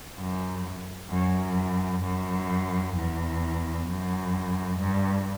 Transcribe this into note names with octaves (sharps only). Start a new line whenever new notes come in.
F#2
F#2
F#2
E2
F#2
G2